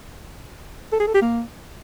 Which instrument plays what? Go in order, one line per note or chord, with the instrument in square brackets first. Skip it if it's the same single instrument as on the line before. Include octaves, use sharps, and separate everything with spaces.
[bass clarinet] A4
G#4
A4
G4
A#3